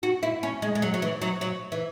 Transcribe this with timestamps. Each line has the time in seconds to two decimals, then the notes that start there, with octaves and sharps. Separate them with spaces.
0.03 F#4
0.23 E4
0.43 C#4
0.62 G#3
0.75 G#3
0.82 F#3
0.94 F#3
1.02 E3
1.22 F#3
1.41 F#3
1.72 E3